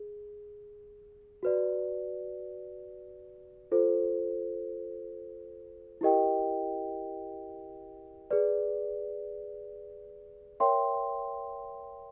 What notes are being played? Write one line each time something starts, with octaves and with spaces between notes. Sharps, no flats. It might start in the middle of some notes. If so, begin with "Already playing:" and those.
Already playing: G#4
F#4 B4 D5
F4 A4 C5
E4 G4 A#4 D#5 G5
G#4 B4 D5
A#4 C#5 E5 G5 C6